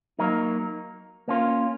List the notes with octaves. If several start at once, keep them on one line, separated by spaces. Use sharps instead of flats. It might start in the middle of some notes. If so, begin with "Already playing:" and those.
F#3 A#3 D#4 A#4
A#3 C#4 F4